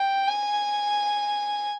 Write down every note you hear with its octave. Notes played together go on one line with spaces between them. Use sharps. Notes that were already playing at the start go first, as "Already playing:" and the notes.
Already playing: G5
G#5